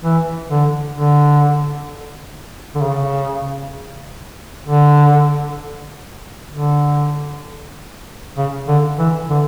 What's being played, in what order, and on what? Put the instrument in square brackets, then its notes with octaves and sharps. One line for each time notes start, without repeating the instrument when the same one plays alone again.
[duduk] E3
D3
D3
D3
C#3
D3
D3
C#3
D3
E3
D3